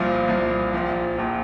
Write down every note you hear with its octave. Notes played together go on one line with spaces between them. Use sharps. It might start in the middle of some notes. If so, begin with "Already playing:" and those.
Already playing: C2 A#2 F3 F5
C2 A#2 F3
A#1 A#2 F3
A#1 A#2 F3